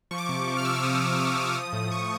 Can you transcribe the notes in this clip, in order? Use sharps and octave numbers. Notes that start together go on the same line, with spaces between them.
F3 C#6
D6
C3 C#6
F3
F6
C3 E6
C3 D#6
C3 E6
F3 D#6
C3
F3
A2
A2 C#6